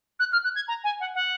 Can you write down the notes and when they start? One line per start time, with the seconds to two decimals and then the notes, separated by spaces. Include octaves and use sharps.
0.19 F#6
0.32 F6
0.44 F#6
0.55 G#6
0.68 A#5
0.84 G#5
1.00 F#5
1.15 F#5